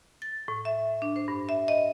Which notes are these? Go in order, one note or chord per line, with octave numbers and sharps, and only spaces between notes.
A6
A2
E5
D4
C5
G2
E5
D#5